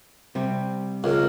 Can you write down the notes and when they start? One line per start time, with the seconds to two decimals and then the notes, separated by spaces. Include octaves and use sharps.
0.35 C3 G3
1.04 C#2 A#4